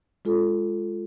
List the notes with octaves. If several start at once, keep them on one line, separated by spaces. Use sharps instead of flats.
G#3 F4 A4